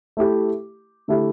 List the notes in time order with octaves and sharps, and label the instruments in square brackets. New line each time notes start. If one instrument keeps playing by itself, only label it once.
[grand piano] A3 E4 G4
D3 A3 E4 G4